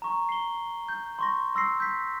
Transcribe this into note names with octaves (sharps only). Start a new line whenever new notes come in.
A#5 C#6
C7 G7
G6
C6 C#6 A#6
C6 E6 A#6 C7
G6 B6